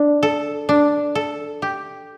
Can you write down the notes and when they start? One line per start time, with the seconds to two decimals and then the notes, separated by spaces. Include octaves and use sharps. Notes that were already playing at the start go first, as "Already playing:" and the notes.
Already playing: D4
0.23 A4
0.69 D4
1.15 A4
1.62 G4